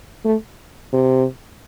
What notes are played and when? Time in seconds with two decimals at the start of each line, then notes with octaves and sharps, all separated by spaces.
0.25 A3
0.93 C3